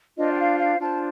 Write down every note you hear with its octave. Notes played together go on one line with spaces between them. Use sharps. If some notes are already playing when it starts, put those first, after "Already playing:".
D4 F4 C5 D#5
G5
F5
F5
D4 F4 C5 A5